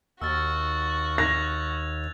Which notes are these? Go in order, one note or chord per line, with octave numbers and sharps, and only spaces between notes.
D#2 F#4 E6 F6 A6
F#6 G#6 A#6 F7